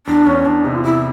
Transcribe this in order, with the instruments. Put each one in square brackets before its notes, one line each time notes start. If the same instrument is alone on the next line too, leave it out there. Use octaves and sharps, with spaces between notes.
[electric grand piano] E2 [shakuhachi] D4
[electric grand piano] E2 [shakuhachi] C#4
[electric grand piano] E2 [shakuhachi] D4
[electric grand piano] C3 [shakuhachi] D#4
[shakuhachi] F4
[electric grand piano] C3 [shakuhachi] E4